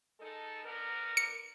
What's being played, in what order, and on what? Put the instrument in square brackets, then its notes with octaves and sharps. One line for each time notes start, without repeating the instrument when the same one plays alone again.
[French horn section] G#3 D#4 A4
D3 B3 A#4
[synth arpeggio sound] C#7